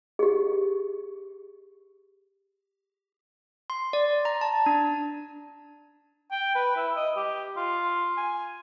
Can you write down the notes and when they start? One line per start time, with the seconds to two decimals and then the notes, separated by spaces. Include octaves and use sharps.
0.19 G4 G#4
3.70 C6
3.93 D5
4.25 A#5
4.41 A5
4.66 D4
6.31 G5
6.55 B4
6.77 E4
6.96 D#5
7.16 G4
7.56 F4
8.17 G#5